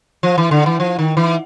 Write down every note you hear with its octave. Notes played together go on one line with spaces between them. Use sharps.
F3
E3
D3
E3
F3
D#3
E3